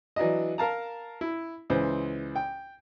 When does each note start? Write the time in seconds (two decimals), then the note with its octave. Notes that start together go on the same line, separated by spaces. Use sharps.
0.16 E3 F#3 D4 D#5
0.58 A#4 F5 A5 A#5
1.21 E4
1.70 C#2 E3 C5
2.36 G5